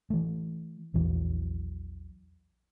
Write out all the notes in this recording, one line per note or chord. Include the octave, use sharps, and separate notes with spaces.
E3 A3
A#1 E2 E3 F#3